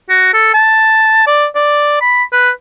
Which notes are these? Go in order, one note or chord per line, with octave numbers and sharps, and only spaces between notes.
F#4
A4
A5
D5
D5
B5
B4